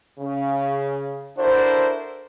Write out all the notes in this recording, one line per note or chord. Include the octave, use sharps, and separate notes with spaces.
C#3
D4 E4 F#4 A4 A#4 C5